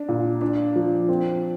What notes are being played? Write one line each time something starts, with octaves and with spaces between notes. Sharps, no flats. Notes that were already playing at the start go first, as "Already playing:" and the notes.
Already playing: D4
A#2
D4
F3
C4